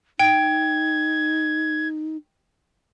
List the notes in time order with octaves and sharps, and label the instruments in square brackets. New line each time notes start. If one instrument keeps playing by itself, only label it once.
[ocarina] D#4 [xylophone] G5 [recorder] G#6